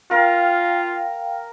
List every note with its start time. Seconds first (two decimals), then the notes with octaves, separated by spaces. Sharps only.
0.11 F4 A#4 F5 G5